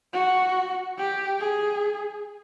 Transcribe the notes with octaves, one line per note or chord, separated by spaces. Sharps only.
F#4
G4
G#4